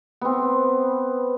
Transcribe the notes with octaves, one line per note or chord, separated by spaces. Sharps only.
B3 C4